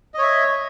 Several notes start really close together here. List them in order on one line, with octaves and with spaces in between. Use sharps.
D#5 C#5 E5